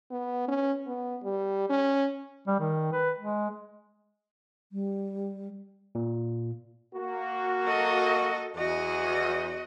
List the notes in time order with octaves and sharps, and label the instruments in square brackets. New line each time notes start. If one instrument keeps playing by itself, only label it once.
[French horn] B3
C#4
B3
G3
C#4
[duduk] G3
D#3
B4
G#3
[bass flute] G3
[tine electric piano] A#2
[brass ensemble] A#3 F#4
[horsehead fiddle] A4 D#5
[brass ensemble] E2 [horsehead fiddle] F#4 D#5